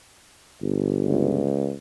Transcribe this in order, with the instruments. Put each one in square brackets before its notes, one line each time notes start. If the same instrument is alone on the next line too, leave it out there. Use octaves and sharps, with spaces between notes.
[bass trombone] G1
[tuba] C#2